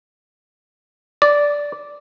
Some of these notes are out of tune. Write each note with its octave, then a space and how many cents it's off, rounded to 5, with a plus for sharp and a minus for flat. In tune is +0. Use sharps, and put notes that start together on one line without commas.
D5 -10